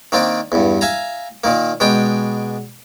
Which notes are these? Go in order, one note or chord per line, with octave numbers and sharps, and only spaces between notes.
D#3 A#3 C4 D4
E2 G2
E5 F5 G#5 A#5
A#2 D#3 A#3
B2 G#3 D4 G5